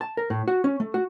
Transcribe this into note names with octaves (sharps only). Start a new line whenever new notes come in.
A5
A#4
A2
F#4
C#4
A3
F#4